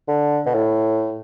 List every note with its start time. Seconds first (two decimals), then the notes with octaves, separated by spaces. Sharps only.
0.08 D3
0.46 B2
0.54 A2